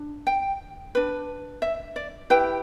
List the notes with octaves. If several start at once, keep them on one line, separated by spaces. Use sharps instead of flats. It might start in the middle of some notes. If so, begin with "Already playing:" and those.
Already playing: D4
G5
D4 B4
E5
D5
E4 G4 B4 G5